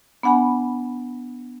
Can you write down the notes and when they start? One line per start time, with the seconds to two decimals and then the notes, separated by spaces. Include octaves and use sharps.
0.23 B3 D4 F#5 G#5 B5